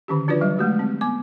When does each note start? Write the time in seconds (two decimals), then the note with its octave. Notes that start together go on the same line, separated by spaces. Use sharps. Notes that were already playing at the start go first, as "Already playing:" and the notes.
0.08 D3 D#3 C#4 G4
0.28 F3 D4 F4 F#4 B4 D5
0.41 E3 F#3 G3 D#5
0.58 G#3 A3 F#4 G4
0.79 C4
1.01 B3 D6